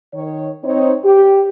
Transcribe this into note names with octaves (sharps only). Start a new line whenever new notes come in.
D#3 C#5
C4 D#4 C#5
G4